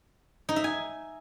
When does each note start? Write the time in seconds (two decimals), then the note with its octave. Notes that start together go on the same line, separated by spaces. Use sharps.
0.49 D#4
0.56 E5
0.64 G#5